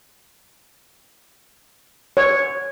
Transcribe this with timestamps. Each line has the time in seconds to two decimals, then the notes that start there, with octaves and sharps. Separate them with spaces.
2.17 C#5